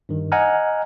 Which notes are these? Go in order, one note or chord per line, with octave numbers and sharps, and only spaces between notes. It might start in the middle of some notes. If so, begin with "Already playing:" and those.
G2 D#3
D#5 F#5 G#5 A#5 F6